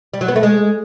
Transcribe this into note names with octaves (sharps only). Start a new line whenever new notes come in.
G3
F#3
B3
A3
G#3